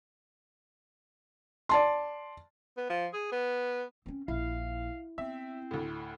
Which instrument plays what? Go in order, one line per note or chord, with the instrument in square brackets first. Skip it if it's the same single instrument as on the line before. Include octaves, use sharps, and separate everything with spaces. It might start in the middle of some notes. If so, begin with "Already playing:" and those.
[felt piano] D5 A5 C6
[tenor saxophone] B3
F3
G#4
B3
[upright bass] C4 C#4
[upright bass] A#1 [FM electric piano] E4 [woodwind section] F5
[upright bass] B3 [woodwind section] C4 [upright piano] E5
[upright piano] D2 A2